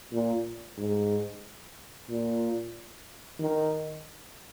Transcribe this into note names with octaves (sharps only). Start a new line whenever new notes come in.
A#2
G#2
A#2
D#3